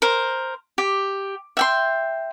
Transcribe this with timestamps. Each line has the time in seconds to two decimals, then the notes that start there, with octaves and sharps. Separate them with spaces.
0.02 A#4 C5
0.78 G4
1.57 E5 G5 C6